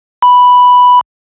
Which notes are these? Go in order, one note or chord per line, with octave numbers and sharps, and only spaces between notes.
B5